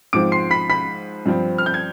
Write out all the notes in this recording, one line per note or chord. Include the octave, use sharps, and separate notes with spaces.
G#2 F3 C4 D6 D7
C6 C7
B5 B6
B5 B6
G2 F3 C4
F6
G6
G#6